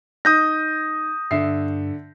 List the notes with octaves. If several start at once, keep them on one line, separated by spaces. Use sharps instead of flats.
D#4 D#6 G6 A#6
G2 D3 E5 C7